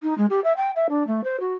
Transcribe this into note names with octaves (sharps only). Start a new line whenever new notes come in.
D#4
G#3
G4
E5
G5
E5
D4
A3
C5
F#4